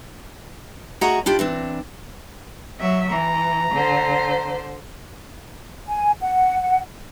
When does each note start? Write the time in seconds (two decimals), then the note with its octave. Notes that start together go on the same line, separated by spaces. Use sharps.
1.01 A3 F#4 G#4 D#5 F#5 A#5
1.26 D4 E4 F4 G4
1.39 E3 C4 D4
2.79 F#3 E5
3.12 E3 A#5
3.72 D3 C5
5.88 G#5
6.21 F#5